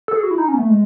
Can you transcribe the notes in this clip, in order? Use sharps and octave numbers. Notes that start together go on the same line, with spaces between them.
A4
G#4
F#4
E4
D#4
C#4
B3
A3
G#3